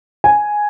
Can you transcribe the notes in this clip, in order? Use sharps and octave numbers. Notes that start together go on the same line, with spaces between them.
G#5